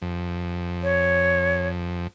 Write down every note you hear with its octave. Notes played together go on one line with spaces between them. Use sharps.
F2
C#5